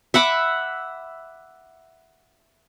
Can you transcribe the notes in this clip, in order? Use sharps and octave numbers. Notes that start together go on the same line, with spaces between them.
E5 F#5 B5 D6